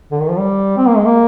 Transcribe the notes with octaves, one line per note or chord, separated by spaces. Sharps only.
D3
D#3
F3
G3
C4
A#3
G#3
A#3